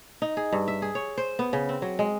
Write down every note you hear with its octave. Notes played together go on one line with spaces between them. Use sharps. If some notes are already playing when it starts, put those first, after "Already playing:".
D#4
G#4
G2
E5
G#4
C#5
C5
B3
C#3
C4
F#3
G#3